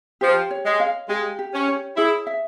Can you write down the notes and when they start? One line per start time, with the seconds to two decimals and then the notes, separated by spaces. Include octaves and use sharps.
0.21 F3 G4
0.51 C#5
0.65 G#3
0.80 F5
1.09 G#3 G4
1.39 G4
1.54 C#4
1.68 C#5
1.97 E4 G#4
2.27 E5